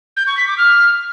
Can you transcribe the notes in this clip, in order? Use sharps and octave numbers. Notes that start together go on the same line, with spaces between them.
G6
C#6
B6
D6
F6